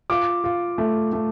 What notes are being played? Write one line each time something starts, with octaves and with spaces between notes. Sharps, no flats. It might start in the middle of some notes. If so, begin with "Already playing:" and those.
F4 D6
F4
A3
A3